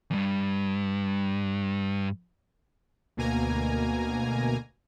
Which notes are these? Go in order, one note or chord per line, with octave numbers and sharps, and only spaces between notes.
E2 G2
D2 B2 A#3 G#5 A#5